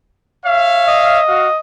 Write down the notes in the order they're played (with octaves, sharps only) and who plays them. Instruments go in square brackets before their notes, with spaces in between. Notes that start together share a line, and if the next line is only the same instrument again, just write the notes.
[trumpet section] C#5 E5 F5
[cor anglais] D#5
[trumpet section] F#4 F5